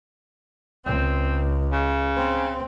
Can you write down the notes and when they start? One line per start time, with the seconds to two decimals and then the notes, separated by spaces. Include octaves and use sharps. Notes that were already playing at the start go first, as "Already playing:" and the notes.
0.86 C#2 C4
1.72 C#3
2.17 C4